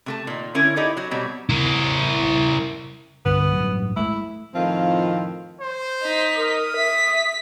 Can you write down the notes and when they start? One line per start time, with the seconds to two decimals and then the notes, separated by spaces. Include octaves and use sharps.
0.06 C3 A3 A5
0.27 A#2 D#3
0.55 D3 C#4 E4 A#4 C#5
0.76 D#4 E4 G4 A4 D5
0.97 F#3 F#4
1.11 B2 F#3 G3 C4
1.49 E4 A#4
3.26 C2 G2 D3 B3
3.52 A1 G2 F#3
3.96 G#3 A3 E4
4.55 F2 A2 D#3 F3 C4 F4
5.60 C5
6.03 D#4 B6
6.36 A#4 D#6
6.76 E5 B6